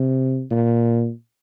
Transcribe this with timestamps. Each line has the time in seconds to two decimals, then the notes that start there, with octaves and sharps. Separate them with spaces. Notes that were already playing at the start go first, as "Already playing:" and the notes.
Already playing: C3
0.51 A#2